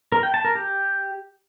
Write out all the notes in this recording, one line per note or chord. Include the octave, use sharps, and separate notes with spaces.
A#4
G5
A5
A#4
G4